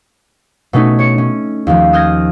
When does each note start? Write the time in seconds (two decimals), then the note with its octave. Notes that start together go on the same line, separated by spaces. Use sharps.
0.73 B2 A3 C#4 D#4
0.99 C#5 C#7
1.18 C#4
1.67 D#2 F3
1.93 D#6 F6 G6 G#6 A#6